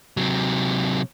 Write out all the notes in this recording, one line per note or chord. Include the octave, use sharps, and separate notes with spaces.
C3 F#3